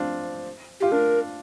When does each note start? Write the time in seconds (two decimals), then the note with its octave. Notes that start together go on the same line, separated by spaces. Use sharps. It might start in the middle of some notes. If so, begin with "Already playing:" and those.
Already playing: F3 C4 D4 F4
0.80 F4 G4
0.92 D4 A#4